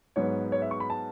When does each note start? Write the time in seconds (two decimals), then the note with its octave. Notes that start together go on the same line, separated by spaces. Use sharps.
0.16 G#2 F#3 B3 C#5
0.52 C#5
0.62 E5
0.71 C#6
0.80 B5
0.90 A5